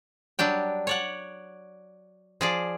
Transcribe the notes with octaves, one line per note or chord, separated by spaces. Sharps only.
F#3 G3 D4 G5
C#5 D5 F#5
F3 G#4 D5